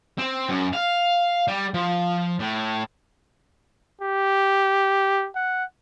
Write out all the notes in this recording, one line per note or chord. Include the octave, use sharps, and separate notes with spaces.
C4
F#2
F5
G3
F3
A2
G4
F#5